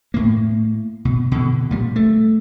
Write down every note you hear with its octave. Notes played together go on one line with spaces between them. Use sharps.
A2 A#3
B2
B2 D3
A#2 G3
A3